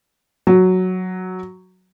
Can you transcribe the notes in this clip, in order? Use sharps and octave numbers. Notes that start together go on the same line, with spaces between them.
F#3